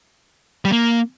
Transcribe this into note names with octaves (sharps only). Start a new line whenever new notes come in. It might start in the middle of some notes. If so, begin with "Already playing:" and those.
G3
A#3